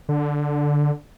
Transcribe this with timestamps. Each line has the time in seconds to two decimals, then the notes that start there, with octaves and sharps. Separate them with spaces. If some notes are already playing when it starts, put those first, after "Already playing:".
0.09 D3